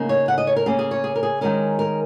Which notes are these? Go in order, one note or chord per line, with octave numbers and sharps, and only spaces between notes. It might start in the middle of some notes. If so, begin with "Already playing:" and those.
Already playing: C#3 A#3 D#4
C#5
F#5
D#5
C#5
A#4
C#3 A#3 C#4 G#4
G#4
C#5
G#4
A#4
G#4
D#3 G#3 C#4 A#4
A#4